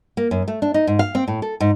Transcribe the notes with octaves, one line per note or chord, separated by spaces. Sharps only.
A#3
F#2
A3
D4
D#4
G#2
F5
C4
A2
A4
G#2